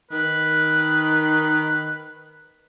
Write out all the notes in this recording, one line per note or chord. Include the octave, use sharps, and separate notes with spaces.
D#3 B4